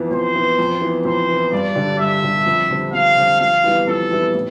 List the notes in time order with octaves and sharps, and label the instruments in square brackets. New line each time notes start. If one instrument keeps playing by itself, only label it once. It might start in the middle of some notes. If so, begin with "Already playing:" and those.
Already playing: [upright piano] F2 E3 B3
[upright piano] F2 [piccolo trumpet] C5
[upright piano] E3 B3
F2
E3 B3
[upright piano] F2 [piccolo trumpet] C5
[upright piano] E3 B3
[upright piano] G2 [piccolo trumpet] D5
[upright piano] D3 G3 D4
[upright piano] G2 [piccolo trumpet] E5
[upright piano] D3 G3 D4
F2
D3 G3 C4
[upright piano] F2 [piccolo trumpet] F5
[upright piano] D3 G3 C4
[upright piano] F2 [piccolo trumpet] F5
[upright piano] E3 G3 B3 E4
[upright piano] F2 [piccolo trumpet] A4
[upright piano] E3 G3 B3 E4
A2